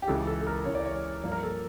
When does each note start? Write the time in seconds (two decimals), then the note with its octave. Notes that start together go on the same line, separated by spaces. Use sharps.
0.02 G4
0.08 C#2 C#3 E3 A4
0.27 A4
0.41 A4
0.47 A#4
0.65 C#2 C#3 E3 C#5
0.75 D5
0.85 C#5
1.23 G2 F3 A#3 D4
1.32 A#4
1.43 A4